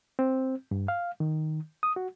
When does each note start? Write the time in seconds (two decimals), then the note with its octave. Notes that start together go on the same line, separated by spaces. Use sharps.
0.19 C4
0.71 G2
0.88 F5
1.20 D#3
1.83 D#6
1.96 F#4